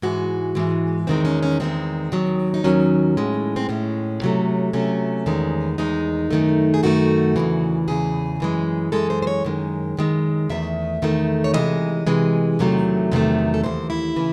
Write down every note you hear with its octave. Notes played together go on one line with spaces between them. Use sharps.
G#2 E3 G#3 F#4
G#2 E3 G#3
E2 D#3 G#3 C4
C#4
C#4
E2 D#3 G#3 C4
D#2 D#3 F#3
D#4
D#2 D#3 F#3 C#4
A2 G#3
C4
A2 G#3 C#4
C3 F#3 A3
C3 F#3 A3 C#4
E2 D#3 G#3
E2 D#3 G#3 D#4
F#2 D#3 A3
G#4
F#2 D#3 A3 F#4
E2 C#3 E3
E2 C#3 E3 G#4
F#2 E3 G#3
F#2 E3 G#3 A4
C5
C5
C#5
F#2 D#3 G#3
F#2 D#3 G#3
E2 D#3 A3 E5
E2 D#3 A3
C#5
C3 E3 G#3 D#5
C3 E3 G#3
E2 C3 D#3 F#3 A3
E2 C3 D#3 F#3 A3
A4
D#2 C#3 E3 C5
E4
C#3 E3